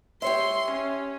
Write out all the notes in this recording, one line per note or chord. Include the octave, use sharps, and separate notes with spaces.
G4 C#5 E5 C6
C#4